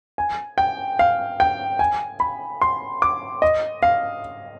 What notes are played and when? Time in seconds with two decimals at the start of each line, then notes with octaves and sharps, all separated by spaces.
0.18 G#5
0.58 G5
0.99 F5
1.40 G5
1.79 G#5
2.20 B5
2.62 C6
3.02 D6
3.42 D#5
3.83 F5